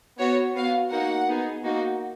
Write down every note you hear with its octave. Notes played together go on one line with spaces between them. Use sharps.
B3 F#4 C#5
B3 F#4 F5
A#3 D#4 F#4 F#5
B3 D#4 G#4
A#3 D#4 F#4